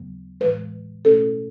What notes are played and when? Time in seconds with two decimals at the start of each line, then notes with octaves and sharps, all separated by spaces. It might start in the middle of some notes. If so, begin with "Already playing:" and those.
Already playing: D#2 C#3 F#3 B3
0.40 A2 E3 G#3 B4
1.05 B2 A3 C#4 E4 A4